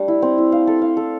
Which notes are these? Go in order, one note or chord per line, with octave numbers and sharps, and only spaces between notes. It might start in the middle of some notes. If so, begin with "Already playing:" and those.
Already playing: G3 A3 D4
E4
C4
E4
F5
A4
F5
A4